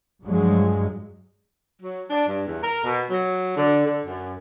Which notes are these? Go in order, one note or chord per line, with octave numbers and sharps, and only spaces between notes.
G2 F3 F#3 G#3
F#3
D4
G2
E2
A#4
B2
F#3
D3
D3
F#2